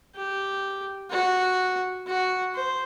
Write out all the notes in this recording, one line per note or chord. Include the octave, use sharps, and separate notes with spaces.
G4
F#4
F#4
C5